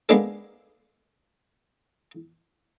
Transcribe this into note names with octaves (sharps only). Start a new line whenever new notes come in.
G#3 A#3 B3 D4 G#4 A4